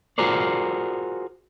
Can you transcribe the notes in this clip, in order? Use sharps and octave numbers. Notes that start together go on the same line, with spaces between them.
F4 F#4 G#4 A#4 C5 D5